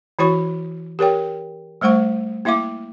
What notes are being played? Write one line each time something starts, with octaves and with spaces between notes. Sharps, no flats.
E3 E4 F#4 C#5 C#6
G4 A#4 C#5 G5
G3 A3 C5 F#5 C#6
A#3 E4 E5 F5 D6